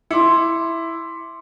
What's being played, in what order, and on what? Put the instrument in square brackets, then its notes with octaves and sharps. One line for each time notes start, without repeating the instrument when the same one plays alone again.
[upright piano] E4 [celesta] C6 D6 C#7